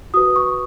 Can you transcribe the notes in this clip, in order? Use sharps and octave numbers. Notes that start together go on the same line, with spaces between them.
F#4 B4 D#6
C#6